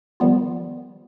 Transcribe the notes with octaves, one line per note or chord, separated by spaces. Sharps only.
D#3 F3 G3 B3 F4